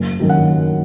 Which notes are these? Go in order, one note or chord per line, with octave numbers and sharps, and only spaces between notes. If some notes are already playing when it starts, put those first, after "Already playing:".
Already playing: F#1
F#2 D#3 F#3
F#5